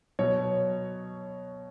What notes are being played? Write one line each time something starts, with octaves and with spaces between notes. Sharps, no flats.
B2 F#3 C#5